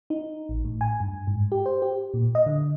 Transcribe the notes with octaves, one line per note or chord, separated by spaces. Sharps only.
D#4
A1
A2
G#5
G2
G#2
G4
C5
G4
A#2
D#5
D3